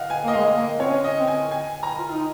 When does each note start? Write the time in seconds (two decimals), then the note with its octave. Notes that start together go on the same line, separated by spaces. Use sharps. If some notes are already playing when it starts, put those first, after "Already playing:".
Already playing: D#5 F5 F#5
0.10 G#5
0.25 A#3 D#5
0.33 G#3 F5
0.45 A#3
0.56 A#3 D#5
0.79 C4 C#5
0.89 C#4
1.04 D#5
1.19 C4
1.27 G#5
1.51 G#5
1.83 A#5
1.98 F4
2.12 D#4